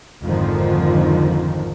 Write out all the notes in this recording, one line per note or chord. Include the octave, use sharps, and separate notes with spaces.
G#1 F2 D3 D#3 F3